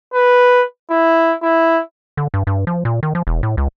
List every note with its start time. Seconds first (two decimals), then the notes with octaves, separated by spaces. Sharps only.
0.14 B4
0.90 E4
1.43 E4
2.17 D3
2.34 G2
2.47 G2
2.67 F3
2.85 A#2
3.03 D#3
3.15 F3
3.27 E1
3.43 A2
3.57 C#2